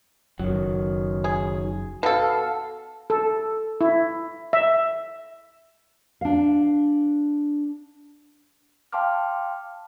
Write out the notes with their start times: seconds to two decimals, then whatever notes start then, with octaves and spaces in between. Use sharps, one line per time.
0.39 F#1 F#2 D#3 F#3
1.24 G#4
2.03 B2 A4 F5 A5
3.10 A4
3.81 E4
4.53 E5
6.21 D4 F5
8.93 F5 G5 A5 C6 D6 F6